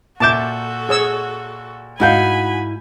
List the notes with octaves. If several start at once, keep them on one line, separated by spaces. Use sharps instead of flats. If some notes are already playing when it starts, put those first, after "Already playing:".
A#2 F#4 A4 E5 A5 D6 G6
G#4 C#5 E6
G#2 D#4 E4 F#4 F5 G#5 B5 G6